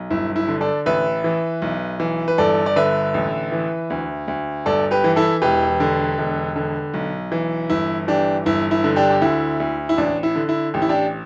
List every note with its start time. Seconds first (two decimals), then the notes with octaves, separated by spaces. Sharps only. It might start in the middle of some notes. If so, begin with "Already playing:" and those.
Already playing: B1
0.10 G1 E4
0.36 E4
0.48 D3
0.61 A4 D5
0.86 A1 B4 E5
1.24 E3
1.62 B1
2.00 E3
2.28 B4
2.38 G1 A4 D5
2.66 D5
2.76 D3 B4 E5
3.14 A1
3.52 E3
3.90 D2
4.28 D2
4.66 G1 A4 D5
4.91 G4 B4
5.04 E3
5.16 E4 A4
5.42 E1 G4 B4
5.80 D3
6.18 E1
6.56 D3
6.94 B1
7.32 E3
7.70 G1 E4
8.08 E3 D4 G4
8.46 G1 E4
8.71 E4
8.84 D3
8.96 D4 G4
9.10 G4
9.22 D2 E4
9.60 D2
9.89 E4
9.98 A1 D4
10.23 E4
10.36 D3
10.49 E4
10.74 A1 G4
10.82 E4
10.89 D4 G4